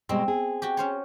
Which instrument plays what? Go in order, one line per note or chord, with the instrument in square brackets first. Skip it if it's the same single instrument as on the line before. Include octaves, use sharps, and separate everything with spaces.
[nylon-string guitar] B2 G3 G#3 [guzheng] C4
[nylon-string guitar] G#4
[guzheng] F#4 G4
C#4 C5 C#5